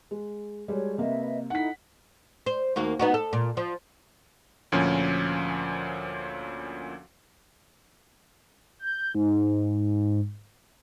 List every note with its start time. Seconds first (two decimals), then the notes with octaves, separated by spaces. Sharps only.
0.11 G#3
0.68 G3 G#3 F#4 A4 C#5
0.98 C3 A#3 B4 D#5 E5
1.50 D#4 E4 A4 F#5 B6
2.46 C5
2.76 D#2 A#3 F#4
2.99 B3 D#4 F#4
3.14 A4
3.33 A#2
3.57 F3
4.72 D2 A#2 F3 C#4
8.79 G6
9.15 G#2